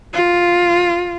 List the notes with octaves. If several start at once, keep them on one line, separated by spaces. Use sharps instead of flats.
F4